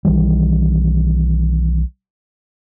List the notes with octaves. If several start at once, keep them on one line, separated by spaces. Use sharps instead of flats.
B1 D#3 E3 G3